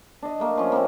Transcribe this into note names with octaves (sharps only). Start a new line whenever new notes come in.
D4 D#5
A3 A#3
F3 C#4
A#3 C4